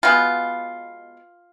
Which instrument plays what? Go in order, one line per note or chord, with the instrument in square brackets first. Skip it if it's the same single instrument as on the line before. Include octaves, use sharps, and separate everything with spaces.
[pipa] B2 G#3 B3 F4